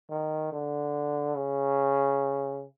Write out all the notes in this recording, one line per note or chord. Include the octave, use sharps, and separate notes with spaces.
D#3
D3
C#3